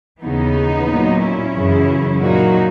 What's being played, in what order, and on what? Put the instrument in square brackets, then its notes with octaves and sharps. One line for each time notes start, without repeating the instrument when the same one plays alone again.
[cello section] D#2 C#3 E3 B3 D#4
A#2 F#3
C#4 E4
F#2 C#3 E3
A#2 F#3 D#4 F#4